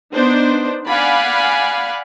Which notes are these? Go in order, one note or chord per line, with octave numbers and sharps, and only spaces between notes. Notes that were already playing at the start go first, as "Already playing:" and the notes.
B3 D4 D#4 C5
D5 F5 F#5 G#5 B5